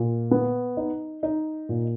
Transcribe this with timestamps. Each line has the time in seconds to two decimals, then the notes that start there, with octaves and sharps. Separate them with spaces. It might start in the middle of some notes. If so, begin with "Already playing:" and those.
Already playing: A#2
0.31 B3
0.77 D#4
1.23 D#4
1.69 A#2